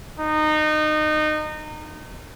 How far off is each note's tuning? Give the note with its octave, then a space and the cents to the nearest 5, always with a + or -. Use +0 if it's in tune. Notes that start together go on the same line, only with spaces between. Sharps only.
D#4 -25